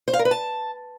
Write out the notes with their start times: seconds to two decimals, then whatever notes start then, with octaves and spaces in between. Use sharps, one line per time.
0.08 C5
0.13 F5
0.19 A#4
0.25 B4
0.31 A5